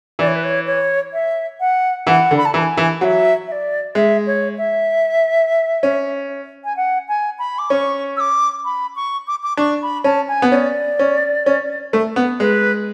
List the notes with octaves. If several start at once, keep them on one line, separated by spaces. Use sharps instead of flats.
E3 D5
C#5
B4
C#5
C#5
E5
F#5
E3 F#5
D3
B5
A5
E3 B5
G#5
E3
F#3 E5 F#5
E5
D5
G#3 E5
C#5
E5
C#4
G#5
F#5
G#5
B5
D6
C#4 C#6
E6
D6
B5
C#6
D6
D6
D4 C#6
B5
C#4 A5
G#5
B3
C#4 D5
C#4
C#4
A3
B3
G#3 B4